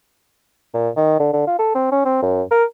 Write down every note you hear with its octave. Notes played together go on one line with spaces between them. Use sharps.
A#2
D#3
D3
D3
F4
A4
C4
C#4
C4
F#2
A#4